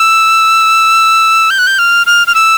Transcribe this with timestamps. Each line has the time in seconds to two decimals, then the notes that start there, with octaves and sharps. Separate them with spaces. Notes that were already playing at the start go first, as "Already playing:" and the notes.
Already playing: E6
1.50 G6
1.58 F#6
1.67 G6
1.78 F6
2.06 F6
2.27 F6
2.35 E6